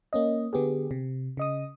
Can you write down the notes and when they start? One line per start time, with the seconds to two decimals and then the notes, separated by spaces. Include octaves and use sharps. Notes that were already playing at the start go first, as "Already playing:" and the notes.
0.13 A#3 C#4 D#5
0.53 D3 B3 G4 G#4
0.91 C3
1.37 C#3 D#5 D#6